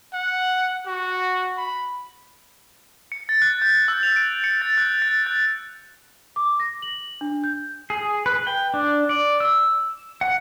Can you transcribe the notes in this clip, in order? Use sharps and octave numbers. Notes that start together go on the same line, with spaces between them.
F#5
F#4
B5
C#7
A6
F#6
G6
E6
F7
D7
C#7
A6
F#6
A6
F#6
D6
A#6
F#7
D4
G6
G#4
B4
G5
D4
D5
E6
F#5